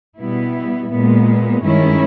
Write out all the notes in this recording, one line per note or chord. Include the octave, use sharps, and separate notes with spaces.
B2 G3 B3 E4
A#2 G#3 B3
G2 D#3 G#3 C#4 E4